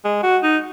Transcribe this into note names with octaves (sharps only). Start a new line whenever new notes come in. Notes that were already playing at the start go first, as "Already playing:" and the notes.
G#3
F#4
D#4